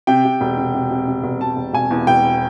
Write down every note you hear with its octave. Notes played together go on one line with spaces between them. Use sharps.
C3 G5
C3
E1
C3
C3
C3
C3
E1
E1 A5
E1
E1 G#5
E2
E1 G5